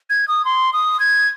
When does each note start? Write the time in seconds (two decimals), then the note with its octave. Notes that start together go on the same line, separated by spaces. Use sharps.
0.10 G#6
0.28 D#6
0.45 C6
0.73 D#6
1.00 G#6